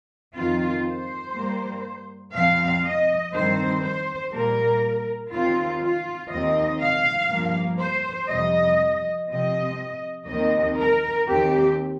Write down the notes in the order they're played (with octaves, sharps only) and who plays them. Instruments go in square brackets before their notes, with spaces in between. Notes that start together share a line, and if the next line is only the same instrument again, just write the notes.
[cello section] F2 D#3 C4 F4
C5
G2 G3 A#3
F2 F3 C4 F5
D#5
G2 D#3 C4 C5
C5
A#2 G3 A#3 A#4
D#2 D#3 C4 F4
F4
D#2 D#3 C4 D#5
F5
G2 F3 A#3
C5
F2 C3 G3 D#5
C3 F3 C4 D#5
D#2 D#3 C4 D#5
A#4
D#2 D#3 C4 G4